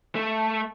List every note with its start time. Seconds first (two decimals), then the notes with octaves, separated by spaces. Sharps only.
0.15 A3